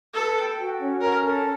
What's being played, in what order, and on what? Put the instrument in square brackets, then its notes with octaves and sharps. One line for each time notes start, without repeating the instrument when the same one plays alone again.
[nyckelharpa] A4 [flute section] B4
[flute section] G5
F#4
C#4
[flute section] C#4 [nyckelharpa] A#4
[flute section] A4